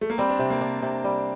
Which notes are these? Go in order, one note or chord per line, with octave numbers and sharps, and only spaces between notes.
A3
A#3
G3 C4
D4
C3
A#3
D4
C3
G3